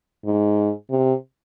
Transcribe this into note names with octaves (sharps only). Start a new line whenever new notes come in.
G#2
C3